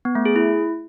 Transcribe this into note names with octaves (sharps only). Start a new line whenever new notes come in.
B3
A3
G#4
E4